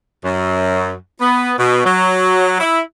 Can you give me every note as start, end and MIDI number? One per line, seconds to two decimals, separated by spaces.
0.24 0.92 42
1.20 1.53 59
1.58 1.85 47
1.85 2.59 54
2.60 2.79 64